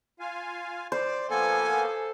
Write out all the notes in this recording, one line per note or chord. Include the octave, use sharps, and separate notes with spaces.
F4 F5 G#5
C5 D5
F3 A#3 B3 A4 G#5